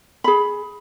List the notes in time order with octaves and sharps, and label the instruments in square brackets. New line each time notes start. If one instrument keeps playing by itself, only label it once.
[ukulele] G#4 B5